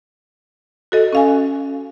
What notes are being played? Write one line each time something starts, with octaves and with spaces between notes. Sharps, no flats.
F#4 A4 D#5
C#4 F5 G#5